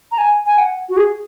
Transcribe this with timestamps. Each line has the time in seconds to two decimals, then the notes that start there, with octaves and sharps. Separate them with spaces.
0.12 A#5
0.18 G#5
0.46 G#5
0.58 F#5
0.89 F#4
0.97 G#4